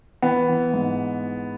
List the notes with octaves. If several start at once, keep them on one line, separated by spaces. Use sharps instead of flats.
E3 B3
E3
G#2